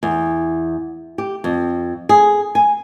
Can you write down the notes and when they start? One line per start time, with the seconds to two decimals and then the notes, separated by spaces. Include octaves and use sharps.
0.03 E2
1.18 G4
1.44 F2
2.09 G#4
2.55 G#5